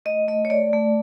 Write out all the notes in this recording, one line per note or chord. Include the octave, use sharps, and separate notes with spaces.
A3 D#5
A3 D#5
C#5
A3 D5
A3